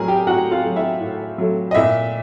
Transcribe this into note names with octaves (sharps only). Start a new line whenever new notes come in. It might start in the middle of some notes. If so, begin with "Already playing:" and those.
Already playing: A2 F#3 A3 G#4 A#4 G#5 A#5
G4 G5
A2 F#4 F#5
F4 F5
F#3 A3
E4 E5
A2
F#3 A3
D#5
A#2 E4 E5